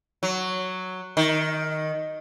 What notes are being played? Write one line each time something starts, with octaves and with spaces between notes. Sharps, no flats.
F#3
D#3